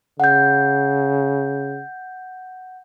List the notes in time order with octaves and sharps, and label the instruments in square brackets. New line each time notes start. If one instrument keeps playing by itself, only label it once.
[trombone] C#3 [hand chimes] F#5 G6